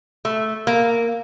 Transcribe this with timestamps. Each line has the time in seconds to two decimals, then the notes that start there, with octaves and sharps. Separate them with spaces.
0.25 A3
0.67 A#3